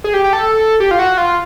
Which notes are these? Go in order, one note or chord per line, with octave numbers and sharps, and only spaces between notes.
G#4
G4
G4
A4
G4
F4
F#4
F4